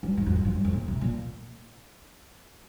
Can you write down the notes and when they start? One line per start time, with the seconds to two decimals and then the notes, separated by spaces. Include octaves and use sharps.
0.03 G2
0.17 G#2
0.26 F2
0.36 G2
0.45 G#2
0.55 G2
0.65 F2
0.73 A#2
0.88 C3
1.01 A#2